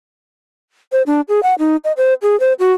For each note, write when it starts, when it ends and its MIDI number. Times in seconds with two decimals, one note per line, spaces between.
0.92 1.02 72
1.06 1.21 62
1.29 1.43 68
1.43 1.55 78
1.59 1.76 63
1.84 1.92 75
1.97 2.14 72
2.22 2.38 68
2.40 2.53 72
2.59 2.73 66